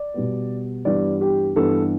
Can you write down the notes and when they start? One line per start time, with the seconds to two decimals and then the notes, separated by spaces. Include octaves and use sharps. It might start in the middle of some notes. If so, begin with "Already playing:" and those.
Already playing: D5
0.14 B2 G3 B3
0.85 G2 E3 G3 B3 D5
1.21 G4
1.56 G2 E3 G3 B3 A4